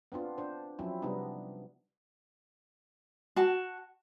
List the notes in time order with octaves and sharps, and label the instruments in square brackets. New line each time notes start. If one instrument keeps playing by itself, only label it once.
[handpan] B3 C4 D4 F4
D4 C5
F3 F#3 C4 C#4 E4
C3 G3 B3 D4 D#4
[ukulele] F#4 A5